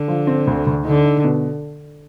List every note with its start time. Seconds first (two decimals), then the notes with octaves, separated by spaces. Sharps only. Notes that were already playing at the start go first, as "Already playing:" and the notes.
Already playing: D3
0.08 F3
0.27 C4
0.47 D2
0.67 D2
0.85 D3 D#4
1.05 D#4
1.24 B2